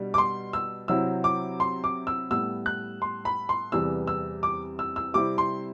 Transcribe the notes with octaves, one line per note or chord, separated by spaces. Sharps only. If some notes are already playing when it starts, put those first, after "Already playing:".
Already playing: B2 G3 D4
D6
C6
E6
C3 F#3 C4 E4 E6
D6
C6
D6
E6
A2 G3 B3 E6
F#6
C6
B5
C6
E2 C3 E3 G3 E6
E6
D6
E6
E6
C3 G3 C4 E4 D6
C6